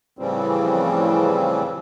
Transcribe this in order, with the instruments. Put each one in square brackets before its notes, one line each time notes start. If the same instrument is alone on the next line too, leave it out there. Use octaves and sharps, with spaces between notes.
[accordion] A2 C#3 E3 F3 G3 C4